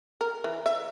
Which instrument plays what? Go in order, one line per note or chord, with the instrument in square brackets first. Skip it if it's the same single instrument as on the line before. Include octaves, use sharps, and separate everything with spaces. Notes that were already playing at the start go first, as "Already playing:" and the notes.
[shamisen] A#4
E3
E5